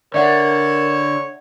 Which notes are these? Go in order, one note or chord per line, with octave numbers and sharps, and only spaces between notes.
D3 A#4 C#5 D5 E5 F#5